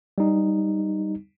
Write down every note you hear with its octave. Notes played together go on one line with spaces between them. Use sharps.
G3 D#4